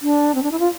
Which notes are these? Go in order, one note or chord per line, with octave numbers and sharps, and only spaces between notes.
D4
C4
D4
E4
F4